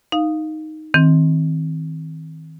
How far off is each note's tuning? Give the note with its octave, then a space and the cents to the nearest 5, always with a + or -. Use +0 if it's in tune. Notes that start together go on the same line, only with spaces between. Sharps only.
D#4 +0 F5 +0
D#3 +30 C4 +10